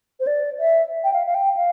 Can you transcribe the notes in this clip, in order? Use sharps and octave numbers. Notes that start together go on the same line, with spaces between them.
C5
D5
E5
G5
F5
F5
G5
F5